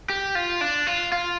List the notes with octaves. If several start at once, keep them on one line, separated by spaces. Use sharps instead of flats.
G4
F4
D4
F4
F4